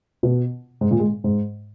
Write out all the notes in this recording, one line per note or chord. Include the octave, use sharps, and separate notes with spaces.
B2
G#2
A#2
G#3
G#2